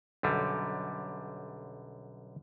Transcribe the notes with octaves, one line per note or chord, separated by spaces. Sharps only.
B1 F#2 D3 G3